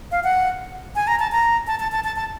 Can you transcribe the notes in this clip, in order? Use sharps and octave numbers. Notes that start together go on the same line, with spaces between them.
F5
F#5
G#5
A#5
A5
A#5
A5
A5
A5
A5
A5